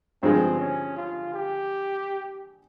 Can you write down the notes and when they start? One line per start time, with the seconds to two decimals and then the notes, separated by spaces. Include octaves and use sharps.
0.23 G2 F3 G#3 C4
0.60 C#4
0.97 F4
1.34 G4